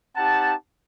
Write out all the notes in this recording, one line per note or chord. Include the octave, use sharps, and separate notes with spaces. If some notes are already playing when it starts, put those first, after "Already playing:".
C4 D#4 G4 F#5 A5